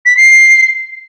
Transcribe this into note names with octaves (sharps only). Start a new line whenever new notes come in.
B6
C7